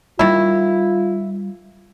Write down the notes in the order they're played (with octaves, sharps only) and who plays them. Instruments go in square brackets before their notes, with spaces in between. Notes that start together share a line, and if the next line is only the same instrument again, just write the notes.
[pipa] D#3 E4 [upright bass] G3 [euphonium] F4